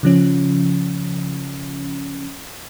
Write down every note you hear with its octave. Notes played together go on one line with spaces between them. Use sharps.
C#3 F3 C#4